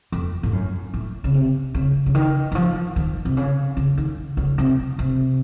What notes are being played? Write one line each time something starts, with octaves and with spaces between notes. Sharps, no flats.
F2
A2
F#2
A2
C#3
C3
C#3
C#3
D#3
D#3
F3
D#3
C3
C#3
C#3
D#3
C#3
C3
C3